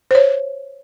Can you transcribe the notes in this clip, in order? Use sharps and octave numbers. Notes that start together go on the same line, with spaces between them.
C5 C#5